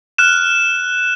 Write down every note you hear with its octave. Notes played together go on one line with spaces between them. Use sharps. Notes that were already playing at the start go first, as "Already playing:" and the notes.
F6 F#6 E7